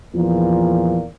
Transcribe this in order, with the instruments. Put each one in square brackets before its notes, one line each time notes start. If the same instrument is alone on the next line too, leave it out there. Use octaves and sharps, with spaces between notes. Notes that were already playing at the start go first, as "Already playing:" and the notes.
[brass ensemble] E2 A#2 [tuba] F3